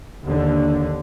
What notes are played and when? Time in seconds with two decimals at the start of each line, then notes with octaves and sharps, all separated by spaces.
0.24 D#2 D3